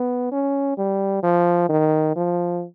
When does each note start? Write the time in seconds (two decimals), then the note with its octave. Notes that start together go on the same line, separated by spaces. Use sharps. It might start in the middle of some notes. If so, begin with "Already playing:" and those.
Already playing: B3
0.32 C#4
0.78 G3
1.23 F3
1.69 D#3
2.16 F3